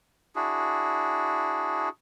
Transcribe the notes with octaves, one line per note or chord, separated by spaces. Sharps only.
D4 E4 F#4 G#4